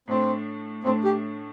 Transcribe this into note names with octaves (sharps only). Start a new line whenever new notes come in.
A2 A3 C4 D4
A2 A3 C4 D4
G4